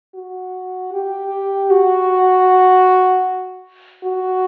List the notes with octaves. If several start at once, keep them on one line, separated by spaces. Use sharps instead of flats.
F#4
G4
F#4
F#4